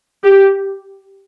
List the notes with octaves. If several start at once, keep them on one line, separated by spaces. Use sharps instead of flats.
G4